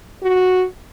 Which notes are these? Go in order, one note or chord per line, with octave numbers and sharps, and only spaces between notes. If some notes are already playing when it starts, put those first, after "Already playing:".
F#4